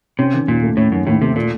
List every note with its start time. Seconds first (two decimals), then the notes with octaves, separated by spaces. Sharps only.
0.19 C3 C#4
0.33 D#3
0.48 D#2 A#2
0.63 A3
0.77 A2 C#4
0.92 F#2 D#3
1.06 D#2 A2
1.21 C3 A3
1.36 A#2 A3